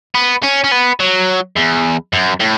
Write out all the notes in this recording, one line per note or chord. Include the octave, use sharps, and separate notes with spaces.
B3
C#4
C#4
B3
F#3
E2
F#2
A2